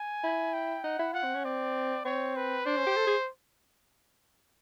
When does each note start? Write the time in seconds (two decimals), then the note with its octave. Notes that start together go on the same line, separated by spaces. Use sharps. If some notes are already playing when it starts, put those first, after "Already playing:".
Already playing: G#5
0.23 E4
0.53 G5
0.84 D#4 F#5
0.99 E4
1.14 F4 F#5
1.24 C4
1.34 C#4
1.45 C4 D5
2.05 C4 C#5
2.36 B4
2.66 D4 C5
2.77 C#4
2.87 G4
2.97 A4
3.07 G#4